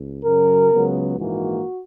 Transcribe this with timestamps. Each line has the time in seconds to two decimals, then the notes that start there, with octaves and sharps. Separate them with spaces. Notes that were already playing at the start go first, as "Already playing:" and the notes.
Already playing: C#2
0.25 F#2 C#3 F#3 A#4
0.72 C#2 C#3 F#3 B3
1.18 A#1 G#2 E3 A#3 F#4